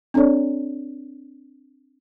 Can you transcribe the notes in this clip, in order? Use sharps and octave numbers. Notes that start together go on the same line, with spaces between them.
C4 D4 A4 C#5 D5